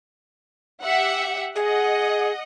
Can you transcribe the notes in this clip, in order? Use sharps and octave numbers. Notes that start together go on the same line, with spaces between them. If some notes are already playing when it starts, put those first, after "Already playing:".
G4 E5 F#5
G#4 D#5 F#5